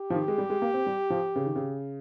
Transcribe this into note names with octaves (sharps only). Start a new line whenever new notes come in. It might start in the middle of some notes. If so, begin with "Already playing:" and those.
Already playing: G4
F3
D#3
G#3
G3
G#3
A#3
C4
G3
F3
C#3
D#3
C#3